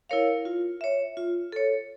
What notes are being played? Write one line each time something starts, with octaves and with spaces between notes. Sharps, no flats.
E4 A#4 C#5 F5
F4
C#5 E5
F4
A4 C#5